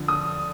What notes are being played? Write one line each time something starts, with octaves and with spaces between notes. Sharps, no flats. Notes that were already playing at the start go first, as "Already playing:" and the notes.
Already playing: D3 F3
D#6